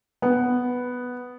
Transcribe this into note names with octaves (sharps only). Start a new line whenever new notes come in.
B3